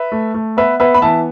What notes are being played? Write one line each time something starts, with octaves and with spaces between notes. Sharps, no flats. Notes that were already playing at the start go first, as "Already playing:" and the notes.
Already playing: B4 E5
A3
A3
B3 B4 E5
B3 B4 E5
B5
E3 E5 A5